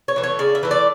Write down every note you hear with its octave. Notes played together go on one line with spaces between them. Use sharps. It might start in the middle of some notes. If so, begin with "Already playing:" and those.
C#5
E3 A3
C#5
C#3 D5
E5
E3 A3
D5